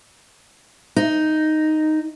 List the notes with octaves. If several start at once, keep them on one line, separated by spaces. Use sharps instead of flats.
D#4